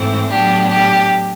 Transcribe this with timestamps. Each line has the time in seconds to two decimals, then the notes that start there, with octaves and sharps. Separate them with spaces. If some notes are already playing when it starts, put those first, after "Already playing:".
Already playing: G#2 E3 A3 C4
0.30 A2 F#3 B3 D4 G4
0.69 G4